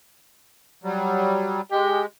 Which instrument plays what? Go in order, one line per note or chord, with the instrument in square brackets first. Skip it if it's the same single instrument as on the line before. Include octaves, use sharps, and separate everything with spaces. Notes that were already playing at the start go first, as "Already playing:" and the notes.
[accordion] F#3 G3
[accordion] G#3 [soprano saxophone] G4